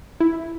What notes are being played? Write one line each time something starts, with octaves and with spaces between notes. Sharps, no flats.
E4